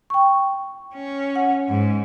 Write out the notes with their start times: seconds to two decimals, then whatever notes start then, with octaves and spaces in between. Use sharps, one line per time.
0.10 G5 C#6
0.94 C#4
1.36 F#5
1.69 G#2